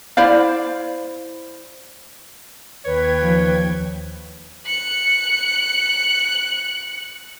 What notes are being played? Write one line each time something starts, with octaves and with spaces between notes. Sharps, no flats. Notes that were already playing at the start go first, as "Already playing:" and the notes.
E4 C5 D5 F5
D#2 B4 C#5 G5 G#6
F3
F#6 C#7